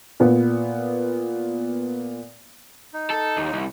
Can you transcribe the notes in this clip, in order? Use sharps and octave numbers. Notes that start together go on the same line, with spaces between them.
A#2 B3
D#4
A4
D#2
C2